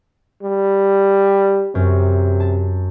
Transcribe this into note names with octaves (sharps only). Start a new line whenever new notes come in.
G3
F#2 C3
A5